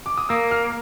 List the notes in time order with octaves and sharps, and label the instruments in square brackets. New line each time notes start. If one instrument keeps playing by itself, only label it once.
[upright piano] D6
D#6
[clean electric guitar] A#3 [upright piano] E6
[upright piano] F6